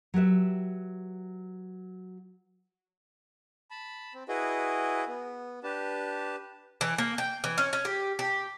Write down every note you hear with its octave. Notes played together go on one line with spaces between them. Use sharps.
F#3 G4 B4 E5
A5 B5
C4
E4 F#4 G#4 B4 D#5
B3
D4 G4 B4 A5
E3
A#3
G5
E3
C#4
C#4
G4
G4